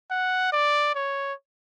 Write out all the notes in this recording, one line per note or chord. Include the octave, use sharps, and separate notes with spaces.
F#5
D5
C#5